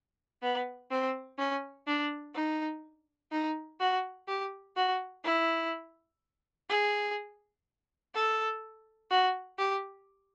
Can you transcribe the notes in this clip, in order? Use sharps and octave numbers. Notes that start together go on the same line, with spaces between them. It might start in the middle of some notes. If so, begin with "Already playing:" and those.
B3
C4
C#4
D4
D#4
D#4
F#4
G4
F#4
E4
G#4
A4
F#4
G4